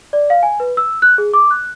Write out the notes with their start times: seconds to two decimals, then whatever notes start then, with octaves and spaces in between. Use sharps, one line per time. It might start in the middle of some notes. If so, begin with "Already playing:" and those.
0.13 D5
0.30 F5
0.43 G#5
0.60 B4
0.77 E6
1.02 F#6
1.18 G#4
1.33 D6
1.51 F#6